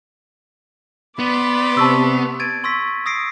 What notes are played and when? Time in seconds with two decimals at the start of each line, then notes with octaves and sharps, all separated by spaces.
1.19 B3 D5 B5 C6
1.77 C3 A5 C#6 E6
2.40 G#6 A6 D7 D#7
2.64 C6 C#6 E6 A#6 B6
3.06 D#6 E6 A#6 C7 D7